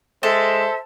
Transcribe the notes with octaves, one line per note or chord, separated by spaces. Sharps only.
G#3 A4 C5 E5